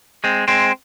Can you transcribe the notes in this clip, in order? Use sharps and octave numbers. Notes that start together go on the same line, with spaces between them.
G#3 C4
G#3 C4